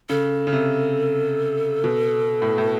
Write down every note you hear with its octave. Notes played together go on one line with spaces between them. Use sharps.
C#3 A4
C#3
C3
B2
A2
A2